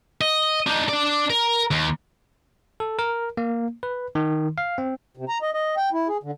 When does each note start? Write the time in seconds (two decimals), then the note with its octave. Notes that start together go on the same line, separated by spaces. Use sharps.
0.21 D#5
0.67 D4 D#4
0.88 D4 D5
1.30 A#4
1.71 D#2
2.80 A4
2.99 A#4
3.37 A#3
3.83 B4
4.15 D#3
4.58 F5
4.78 C4
5.17 C3
5.29 A#5
5.42 D#5
5.54 D#5
5.77 G5
5.93 E4
6.08 G#4
6.23 D3